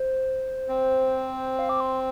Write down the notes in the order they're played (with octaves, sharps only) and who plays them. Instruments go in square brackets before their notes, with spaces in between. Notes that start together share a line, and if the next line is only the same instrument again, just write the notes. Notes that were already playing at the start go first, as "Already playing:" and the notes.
Already playing: [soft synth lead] C5
[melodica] C4
[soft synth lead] F5
D6
C6